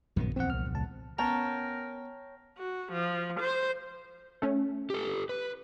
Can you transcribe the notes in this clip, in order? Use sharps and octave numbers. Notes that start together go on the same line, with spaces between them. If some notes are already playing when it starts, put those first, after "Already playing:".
A#1 F#2 D#3 B3
A#1 E2 C4 F#5
C2 F6
C#2 A5
B3 C#4 A#4 C#5 G5 A5 A#5
F#4
F3
C5
A3 C#4
G4 A4
B4